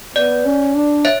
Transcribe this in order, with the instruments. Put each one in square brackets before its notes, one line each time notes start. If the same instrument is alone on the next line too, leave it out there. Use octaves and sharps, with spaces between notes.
[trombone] B3 [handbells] D5
[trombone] C#4
D4
[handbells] C#5 E5